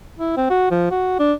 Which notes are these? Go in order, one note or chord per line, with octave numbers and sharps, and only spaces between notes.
E4
C4
F#4
F3
F#4
D4